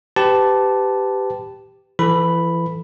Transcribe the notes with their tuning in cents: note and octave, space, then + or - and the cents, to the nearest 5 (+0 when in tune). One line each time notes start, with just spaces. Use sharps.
G4 +0 B4 +30 A5 -5
E3 +30 A4 +0 B5 +0